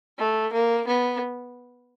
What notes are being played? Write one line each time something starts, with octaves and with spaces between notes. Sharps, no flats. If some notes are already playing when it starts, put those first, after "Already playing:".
A3
A#3
B3